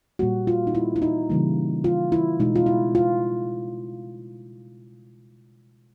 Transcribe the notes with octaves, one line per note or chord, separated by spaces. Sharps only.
A#2 G3 A#3 F#4
F4
D#4
E4
E4
D#4
C#3 E3 G3 A#3
F4
E4
B2 G#3 D#4
F4
E4
F4